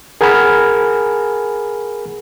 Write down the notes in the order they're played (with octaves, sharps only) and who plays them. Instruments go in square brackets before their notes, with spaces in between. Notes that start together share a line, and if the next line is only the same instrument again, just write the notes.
[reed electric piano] G#4 A#4 F#5 G#5 B5 F6